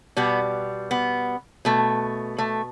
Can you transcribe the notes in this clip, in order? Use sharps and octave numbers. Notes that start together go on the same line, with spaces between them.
B2 G3 B3
B3
B2 A3
A3